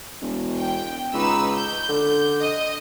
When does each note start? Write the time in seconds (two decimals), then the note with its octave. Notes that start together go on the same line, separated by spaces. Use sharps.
0.21 E1
0.58 G5
1.13 C#2 D#4 B4 E6
1.54 G6
1.89 D3
2.41 D#5